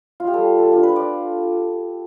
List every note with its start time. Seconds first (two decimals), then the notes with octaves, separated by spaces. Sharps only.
0.20 F4
0.27 G4
0.33 G3 A4
0.59 A4
0.71 D4 F4
0.83 B4
0.96 D5